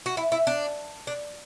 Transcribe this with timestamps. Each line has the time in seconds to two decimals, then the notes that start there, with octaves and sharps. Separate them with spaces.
0.06 F#4
0.17 E4
0.32 E4
0.47 D4
1.07 D4